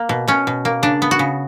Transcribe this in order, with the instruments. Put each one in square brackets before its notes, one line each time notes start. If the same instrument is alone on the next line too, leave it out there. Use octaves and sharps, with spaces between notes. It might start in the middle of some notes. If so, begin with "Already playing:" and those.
Already playing: [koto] A#3
B2
B2 C#4
B2
A#3
C#3 D4
B3
F#4
C#3